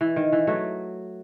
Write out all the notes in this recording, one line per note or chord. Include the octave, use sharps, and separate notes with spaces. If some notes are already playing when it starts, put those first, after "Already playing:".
E3
D#3
E3
F#3 A3